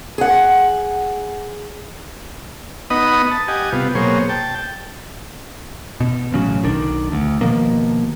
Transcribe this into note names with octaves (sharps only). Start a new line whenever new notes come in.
G#4 F#5
B3 D#4 D#5 F#5 B5 D#6
A5
G4 D#5 F#5 G#5
C3 G3 B3 F4
B2 F#3 A#3 G#4 C5 C#5
G5 A5
B2
A1 C#3 F#3
B1 D#3 D4
D2
B2 D#3 F3 A#3